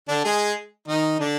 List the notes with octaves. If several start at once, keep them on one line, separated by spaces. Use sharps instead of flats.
D3 D4
G#3 G#4
D#3 D#4
D3 D4